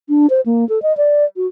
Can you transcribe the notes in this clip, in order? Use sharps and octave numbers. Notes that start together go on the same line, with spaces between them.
D4
C5
A#3
A4
D#5
D5
F#4